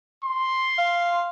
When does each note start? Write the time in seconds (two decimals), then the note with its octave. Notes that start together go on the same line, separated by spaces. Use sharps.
0.24 C6
0.78 F5